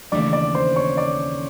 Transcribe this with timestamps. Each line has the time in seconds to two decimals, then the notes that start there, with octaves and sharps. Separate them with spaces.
0.12 D#2 C#3 E3 A3 D4 D5 D6
0.33 D5 D6
0.55 C5 C6
0.76 C#5 C#6
0.97 D5 D6